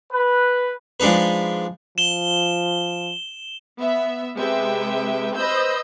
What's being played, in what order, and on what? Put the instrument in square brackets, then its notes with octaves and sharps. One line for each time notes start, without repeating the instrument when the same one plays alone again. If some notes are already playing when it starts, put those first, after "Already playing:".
[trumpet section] B4
[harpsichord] F3 G#3 D4 D#4 B4
[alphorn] F3 [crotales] E7 G7
[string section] B3 E5
C3 G#3 B4 E5 G5
B4 C5 D#5 B5 E6 G6